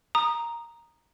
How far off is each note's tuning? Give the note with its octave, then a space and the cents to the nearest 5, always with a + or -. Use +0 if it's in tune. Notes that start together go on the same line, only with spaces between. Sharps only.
A#5 +0 D#6 -15